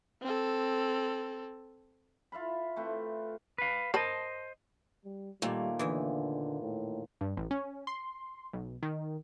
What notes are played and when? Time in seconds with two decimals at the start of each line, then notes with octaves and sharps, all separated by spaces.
0.22 C4 A4
2.32 F4 E5 F5 B5
2.76 A3 C4 B4
3.58 B4 F5
3.94 A#4 C5 D#5 A5 B5
5.05 G3
5.42 D#2 A#2 G3 A3
5.79 E2 D3 E3
6.61 A2
7.21 G2
7.37 A1
7.51 C#4
7.87 C6
8.53 B1
8.83 D#3